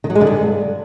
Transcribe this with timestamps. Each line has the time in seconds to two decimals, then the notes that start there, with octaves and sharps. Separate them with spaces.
0.04 D#3
0.10 F#3
0.15 G#3
0.21 D3
0.27 G2